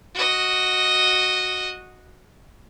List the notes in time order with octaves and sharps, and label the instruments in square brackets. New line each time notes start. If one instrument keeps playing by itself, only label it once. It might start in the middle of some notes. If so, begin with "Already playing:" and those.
[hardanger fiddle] F#4 D#5